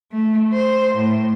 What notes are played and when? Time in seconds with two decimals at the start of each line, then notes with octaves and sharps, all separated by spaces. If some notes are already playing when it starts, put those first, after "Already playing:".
0.12 A3
0.53 C5
0.95 A2